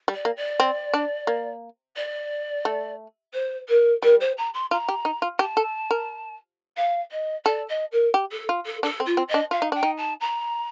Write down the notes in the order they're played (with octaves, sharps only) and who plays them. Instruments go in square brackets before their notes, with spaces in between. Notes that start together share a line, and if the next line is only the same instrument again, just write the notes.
[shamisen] G3
[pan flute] D5
[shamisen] A#3
[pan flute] D5
[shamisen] C4
D4
A#3
[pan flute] D5
[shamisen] A3
[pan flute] C5
A#4
[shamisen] G3 [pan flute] A#4
[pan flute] C5
A#5
C6
[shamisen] F4 [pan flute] A#5
[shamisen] G4
D#4
F4
[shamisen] G4 [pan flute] A5
[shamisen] A4
A#4
[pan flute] F5
D#5
[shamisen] A4 [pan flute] D5
[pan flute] D#5
A#4
[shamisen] G4
[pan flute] A4
[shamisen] F4
[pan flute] A4
[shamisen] D4 [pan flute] A4
[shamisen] C4
[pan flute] F4
[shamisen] C4
[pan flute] D#5
[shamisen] D4
[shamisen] F4 [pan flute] F5
[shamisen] D#4
[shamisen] D4 [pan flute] G5
[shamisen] D#4
[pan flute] A5
A#5